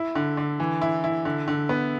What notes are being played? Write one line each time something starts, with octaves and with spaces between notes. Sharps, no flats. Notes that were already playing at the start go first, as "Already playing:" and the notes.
Already playing: E4
D3
D3
E3
E4
E4
D3
D3
B3